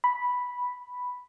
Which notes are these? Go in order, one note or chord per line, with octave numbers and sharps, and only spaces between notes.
B5